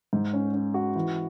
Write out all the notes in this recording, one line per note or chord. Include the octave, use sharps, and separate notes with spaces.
G#2
C#4
C#4
F#4
E3